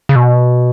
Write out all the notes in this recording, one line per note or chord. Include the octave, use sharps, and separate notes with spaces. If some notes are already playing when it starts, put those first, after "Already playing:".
C#3
B2